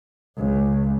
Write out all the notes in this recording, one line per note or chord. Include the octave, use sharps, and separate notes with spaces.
C#2